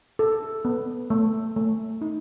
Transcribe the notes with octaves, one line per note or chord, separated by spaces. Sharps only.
A4
B3
A3
A3
D#4